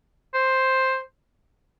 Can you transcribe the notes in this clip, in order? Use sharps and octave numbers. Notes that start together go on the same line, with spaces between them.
C5